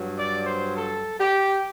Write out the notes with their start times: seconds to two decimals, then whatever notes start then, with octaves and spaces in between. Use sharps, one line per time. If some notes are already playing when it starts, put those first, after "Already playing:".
Already playing: G2 F#3
0.18 D5
0.46 C5
0.76 A4
1.19 G4